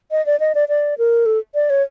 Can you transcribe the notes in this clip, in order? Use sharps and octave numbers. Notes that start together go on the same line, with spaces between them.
D#5
D5
D#5
D5
D5
A#4
A4
D5
C#5